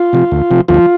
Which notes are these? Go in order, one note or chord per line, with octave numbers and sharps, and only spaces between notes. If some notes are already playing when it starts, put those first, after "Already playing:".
Already playing: F4
C3 F3
D2
C3 F3
D2 F3 F4